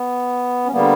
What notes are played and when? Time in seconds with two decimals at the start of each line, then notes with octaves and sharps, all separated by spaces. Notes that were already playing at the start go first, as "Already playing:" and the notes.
Already playing: B3
0.66 C#4
0.72 D3 G3 A#3 B3